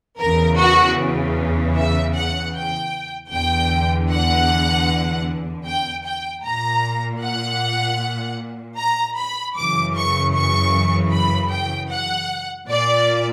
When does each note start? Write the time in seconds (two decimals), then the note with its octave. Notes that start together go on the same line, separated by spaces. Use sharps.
0.20 E2 C#3 E3 A#4
0.60 F#4
1.77 E5
2.15 F#5
2.55 G5
3.32 E2 D3 G5
4.10 F#5
5.67 G5
6.05 G5
6.45 A#2 A#5
7.22 F#5
8.78 A#5
9.18 B5
9.57 F#2 C#3 E3 D6
9.96 C#6
10.34 C#6
11.13 B5
11.51 G5
11.91 F#5
12.69 A#2 D5